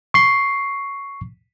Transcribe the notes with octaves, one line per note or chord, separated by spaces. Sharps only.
C#6 C7